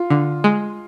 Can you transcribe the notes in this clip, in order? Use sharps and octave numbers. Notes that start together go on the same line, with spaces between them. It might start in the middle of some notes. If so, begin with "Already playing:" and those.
Already playing: F4
D3
G#3